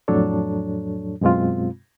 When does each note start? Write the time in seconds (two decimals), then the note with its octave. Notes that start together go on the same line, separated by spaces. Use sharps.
0.08 F2 A2 F#3 D4 A4 C#5
1.21 F#2 B2 G#3 C4 F4